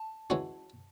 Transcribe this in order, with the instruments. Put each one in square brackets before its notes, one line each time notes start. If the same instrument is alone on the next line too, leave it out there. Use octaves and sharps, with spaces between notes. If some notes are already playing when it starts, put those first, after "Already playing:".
Already playing: [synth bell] A5
[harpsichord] E3 G#3 C#4 F#4